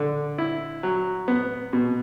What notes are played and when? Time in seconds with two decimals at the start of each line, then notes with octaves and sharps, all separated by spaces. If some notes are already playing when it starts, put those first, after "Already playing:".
Already playing: D3
0.38 E4
0.83 F#3
1.28 B3
1.73 B2